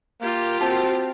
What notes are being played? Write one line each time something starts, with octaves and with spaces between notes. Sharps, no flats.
A#3 F4 G4
C4 F#4 A5